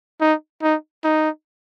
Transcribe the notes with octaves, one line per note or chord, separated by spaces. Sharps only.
D#4
D#4
D#4